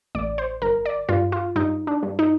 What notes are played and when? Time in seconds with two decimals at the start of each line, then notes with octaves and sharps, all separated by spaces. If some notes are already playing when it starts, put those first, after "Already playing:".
0.15 A1 D5
0.38 C5
0.62 G1 A#4
0.85 D5
1.09 G2 F4
1.32 F4
1.56 G2 D#4
1.87 D4
2.03 G2
2.19 D#4